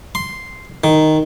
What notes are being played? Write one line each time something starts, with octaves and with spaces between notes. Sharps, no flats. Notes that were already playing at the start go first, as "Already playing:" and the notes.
C6
D#3